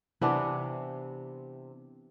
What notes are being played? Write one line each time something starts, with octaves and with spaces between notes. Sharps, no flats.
C3 E3 B3 D4